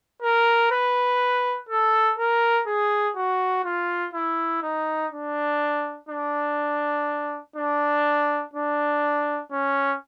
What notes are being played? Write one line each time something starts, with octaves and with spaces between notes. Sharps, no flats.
A#4
B4
A4
A#4
G#4
F#4
F4
E4
D#4
D4
D4
D4
D4
C#4